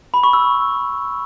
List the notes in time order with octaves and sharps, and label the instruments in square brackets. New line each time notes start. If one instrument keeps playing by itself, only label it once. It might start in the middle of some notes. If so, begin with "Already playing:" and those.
[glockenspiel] B5
C#6
E6